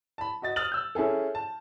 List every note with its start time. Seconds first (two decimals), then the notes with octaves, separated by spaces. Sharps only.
0.18 A5 B5
0.42 F#4 D#5 A6
0.56 D#6 F6 A6 F#7
0.72 E6 G6
0.95 C#4 E4 G#4 A4
1.35 A5